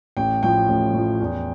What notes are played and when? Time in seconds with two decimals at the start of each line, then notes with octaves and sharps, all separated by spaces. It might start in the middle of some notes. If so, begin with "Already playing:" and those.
0.17 A1 G5
0.43 A2 F3 G5
0.68 A1
0.93 A2 F3
1.20 E2